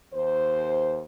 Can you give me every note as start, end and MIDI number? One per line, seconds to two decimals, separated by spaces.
0.14 1.03 39
0.14 1.03 72